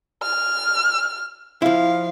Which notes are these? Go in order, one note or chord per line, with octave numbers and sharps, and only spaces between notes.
F6
F3 E4 F5